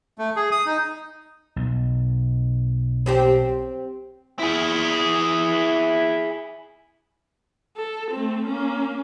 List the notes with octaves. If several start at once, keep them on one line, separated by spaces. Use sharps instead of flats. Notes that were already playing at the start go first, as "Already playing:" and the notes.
A3
G#4
D#6
D#4
B1
C4 G4 C5
E4 G#4
A4
A3 C4
A#3 C#4